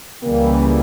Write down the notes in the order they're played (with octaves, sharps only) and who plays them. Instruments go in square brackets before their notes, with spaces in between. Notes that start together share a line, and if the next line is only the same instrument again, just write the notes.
[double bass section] C#2 C#3 E3 G3 [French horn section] A#3